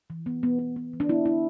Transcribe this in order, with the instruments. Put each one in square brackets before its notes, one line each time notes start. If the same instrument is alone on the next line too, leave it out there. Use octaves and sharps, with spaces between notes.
[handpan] E3
B3
B3
B3
B3
E3
D4
B3 E4
B3 E4